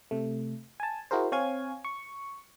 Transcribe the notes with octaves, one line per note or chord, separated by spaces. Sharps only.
C3 A3
G#5 A5
E4 F#4 G#4 A#4 C5
C4 C#5 F5 G#5 G#6
C#6